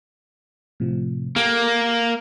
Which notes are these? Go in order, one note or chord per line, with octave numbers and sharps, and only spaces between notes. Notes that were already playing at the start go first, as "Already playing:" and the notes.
A2 C3 F3
A#3 G4 A4 A#4